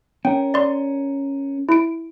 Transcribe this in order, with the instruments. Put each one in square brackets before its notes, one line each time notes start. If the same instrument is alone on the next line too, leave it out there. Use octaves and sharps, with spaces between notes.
[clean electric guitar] C#4 A#4 [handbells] G5
[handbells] D5 C6
E4 D7